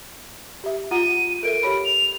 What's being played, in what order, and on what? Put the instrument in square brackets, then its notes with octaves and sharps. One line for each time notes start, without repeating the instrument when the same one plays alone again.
[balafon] G4 E5
[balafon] F4 F#5 A#5 [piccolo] D#7
[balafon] A4 A#4 E5 [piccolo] D7
[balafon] G4 C#5 B5
[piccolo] F7